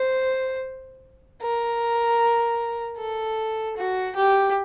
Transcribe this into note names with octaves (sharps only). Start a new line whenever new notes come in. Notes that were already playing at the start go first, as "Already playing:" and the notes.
Already playing: C5
A#4
A4
F#4
G4